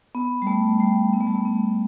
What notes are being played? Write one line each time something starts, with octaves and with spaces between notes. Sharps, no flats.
B3
G3
A3
G3
B3
A3
G3
A3
B3